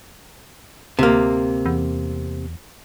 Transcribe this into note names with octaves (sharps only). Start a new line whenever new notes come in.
D2 C3 A#3
E2